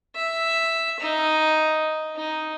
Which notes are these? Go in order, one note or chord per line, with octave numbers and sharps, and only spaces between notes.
E5
D#4
D#4